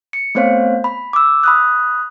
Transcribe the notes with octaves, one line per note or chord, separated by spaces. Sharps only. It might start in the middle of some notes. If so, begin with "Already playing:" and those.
C#7
A3 B3 C4 C5 C#5 F5
B5
D6 E6
B5 D#6 F#6